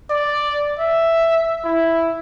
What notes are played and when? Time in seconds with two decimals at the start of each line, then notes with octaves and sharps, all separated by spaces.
0.10 D5
0.79 E5
1.65 E4